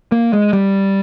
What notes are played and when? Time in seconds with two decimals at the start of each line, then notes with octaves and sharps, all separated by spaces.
0.12 A#3
0.33 G#3
0.53 G3